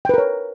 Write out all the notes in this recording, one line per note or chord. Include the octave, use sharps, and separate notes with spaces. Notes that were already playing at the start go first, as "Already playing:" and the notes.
A#4 B4 C#5 G5